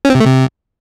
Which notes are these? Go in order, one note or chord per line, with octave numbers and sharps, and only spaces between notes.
C#4
C4
C3
A3
C3